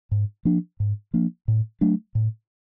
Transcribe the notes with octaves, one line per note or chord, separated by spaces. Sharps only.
G#2
F3 A#3 D4
G#2
F3 A#3 D4
A2
F#3 A3 D4
A2